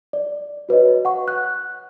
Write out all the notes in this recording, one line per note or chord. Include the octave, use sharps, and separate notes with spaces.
D5
F#4 B4 C#5 D#5
F#5 C#6
F#6